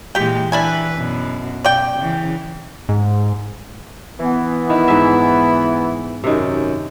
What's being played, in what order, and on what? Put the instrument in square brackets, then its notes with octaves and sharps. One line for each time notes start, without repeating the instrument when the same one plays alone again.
[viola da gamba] A#2 E3 G#3 [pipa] G4 G5
[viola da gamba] E3 B4 [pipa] D4 E4 G#5
[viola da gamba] F#2 B2
[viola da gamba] B2 [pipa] D5 G5
[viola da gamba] C#3 E3
[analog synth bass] G#2
[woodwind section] E3 B3
[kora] D#3 [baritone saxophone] E4
[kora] G#2 E5
[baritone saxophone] F#2 [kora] C3 D#3